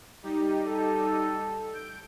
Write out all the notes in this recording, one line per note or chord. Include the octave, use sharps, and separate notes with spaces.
G3 D#4 G4
A4
G6 D7